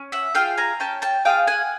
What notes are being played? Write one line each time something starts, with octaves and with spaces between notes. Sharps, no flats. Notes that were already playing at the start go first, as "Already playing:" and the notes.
Already playing: C#4
E5 F#5
F4 G#4 F5 G5
G#5 A#5
C#4 G5 A5
G5 A5
F4 G#4 F5 G5
F#5 G#5